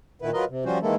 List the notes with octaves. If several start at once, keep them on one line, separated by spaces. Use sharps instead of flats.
A#2 D#3 B3 E4 B4
F#3 F4 A#4 B4 D#5
C3
F3 G3 C#4 F4 F#4 C5
D#3 E3 G#3 A#3 E4 A4